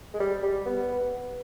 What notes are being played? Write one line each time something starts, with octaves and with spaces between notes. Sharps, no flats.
G#3
G3
G3
B3